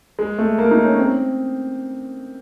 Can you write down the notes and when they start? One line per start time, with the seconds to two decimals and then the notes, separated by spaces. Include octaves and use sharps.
0.19 G#3
0.39 A3
0.58 A#3
0.71 D#4
0.84 C#4
0.97 C4